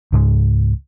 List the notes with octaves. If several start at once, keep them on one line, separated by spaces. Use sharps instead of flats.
C#2 G#2 G#3